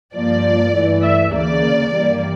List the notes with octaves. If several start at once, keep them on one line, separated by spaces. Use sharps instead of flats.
G2 F3 A#3 D5
G2 E3 A3
E5
D2 C#3 E3 A#3 D5
G2 E3 G3 A#3